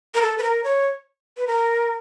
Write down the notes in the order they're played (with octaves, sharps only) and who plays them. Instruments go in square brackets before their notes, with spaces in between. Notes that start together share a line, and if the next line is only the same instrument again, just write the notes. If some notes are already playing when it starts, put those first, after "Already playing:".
[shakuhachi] A#4
A4
B4
A#4
C#5
B4
A#4